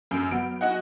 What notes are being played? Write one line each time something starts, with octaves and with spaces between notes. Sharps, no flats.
F#2 F6 G6 D7
F#3 B3 D7
F#4 D#5 F#5 G#5 F#6